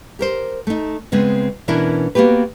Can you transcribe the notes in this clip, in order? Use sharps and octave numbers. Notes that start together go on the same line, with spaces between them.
G4 A#4 C5
A3 D#4
C#3 G#3 B3 C4
B2 E3 C#4 D4 E4 A#4
A#3 B3 F#4 G4 B4